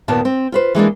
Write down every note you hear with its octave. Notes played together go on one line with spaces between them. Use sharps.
D#2 A#2 A#3 B3 A5
C4
F4 B4 C5
E3 G#3 A#3 D4